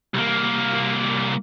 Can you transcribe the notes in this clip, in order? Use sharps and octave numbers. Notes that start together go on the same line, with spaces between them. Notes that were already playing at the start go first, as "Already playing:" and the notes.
C2 A#3